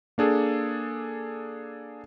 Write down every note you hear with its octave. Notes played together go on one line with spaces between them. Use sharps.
A#3 D4 G#4 A4